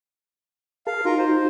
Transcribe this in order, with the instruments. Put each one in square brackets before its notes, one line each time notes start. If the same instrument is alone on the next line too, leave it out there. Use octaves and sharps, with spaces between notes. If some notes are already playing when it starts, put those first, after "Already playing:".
[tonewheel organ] G#4 A#4 A5 [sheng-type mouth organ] F5
[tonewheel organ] D#4 F#4 [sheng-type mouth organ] F4 A#4
[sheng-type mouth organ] C5